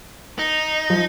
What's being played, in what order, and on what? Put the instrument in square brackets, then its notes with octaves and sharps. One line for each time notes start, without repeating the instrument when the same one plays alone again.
[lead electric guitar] D#4
[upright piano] F3